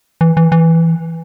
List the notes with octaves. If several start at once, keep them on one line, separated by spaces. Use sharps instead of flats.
E3
E3
E3